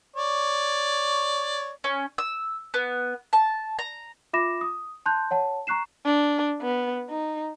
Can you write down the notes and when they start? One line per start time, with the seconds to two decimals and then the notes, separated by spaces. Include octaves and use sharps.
0.16 C#5 D5
1.84 C#4
2.18 E6
2.74 B3
3.33 A5
3.79 A#5
4.33 F4 E5 B5 D6 A#6 E7
4.61 D#6
5.06 A5 C6 F#6 G6
5.31 C#5 F#5 A5
5.67 A#5 C#6 F#6 C7 E7
6.06 D4
6.62 B3
7.10 D#4